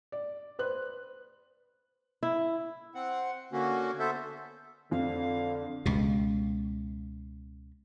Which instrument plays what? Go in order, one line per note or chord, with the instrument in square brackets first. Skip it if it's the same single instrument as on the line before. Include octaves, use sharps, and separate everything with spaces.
[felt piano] D5
B4 C5 F#6
[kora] E4
[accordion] C4 F#5
D3 A#3 C#4 F#4
B3 A4 C5 E5
[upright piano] F2 [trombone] D3 [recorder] F5
[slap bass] C#2 B2